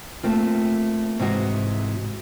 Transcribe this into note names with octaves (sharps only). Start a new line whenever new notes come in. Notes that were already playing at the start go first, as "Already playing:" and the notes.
A3 A#3 C4 F4
G#2 C3 E3 F#4